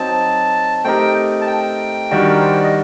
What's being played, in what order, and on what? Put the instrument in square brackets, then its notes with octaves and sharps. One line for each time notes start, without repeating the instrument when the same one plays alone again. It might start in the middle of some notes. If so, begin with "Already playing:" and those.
Already playing: [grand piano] F#3 C4 D#4 [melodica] A5
[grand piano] A3 C4 D#4 G4 A#4 [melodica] G5
[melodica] A5
G5
[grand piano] D#3 G3 D4 F#4
[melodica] A#4
C5
D5
D#5